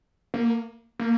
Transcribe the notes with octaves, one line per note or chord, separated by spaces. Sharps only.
A#3
A#3